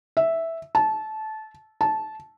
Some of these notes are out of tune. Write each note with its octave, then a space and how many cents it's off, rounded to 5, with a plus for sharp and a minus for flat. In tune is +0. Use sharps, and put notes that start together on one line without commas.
E5 -5
A5 -20
A5 -15